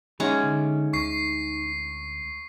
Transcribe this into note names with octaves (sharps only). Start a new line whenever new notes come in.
G#3 C#4 D#4 E5 F#5 A#5
D3
D2 C#6 C7